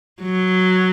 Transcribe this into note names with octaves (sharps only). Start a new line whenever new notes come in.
F#3